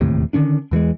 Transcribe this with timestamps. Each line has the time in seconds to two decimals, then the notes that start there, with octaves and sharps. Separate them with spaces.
0.01 E1 D#2 A2 C3
0.33 D3 D#3 C#4 D4
0.71 E2 E3 G3 G#3